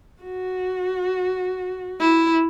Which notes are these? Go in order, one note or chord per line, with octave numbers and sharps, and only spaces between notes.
F#4
E4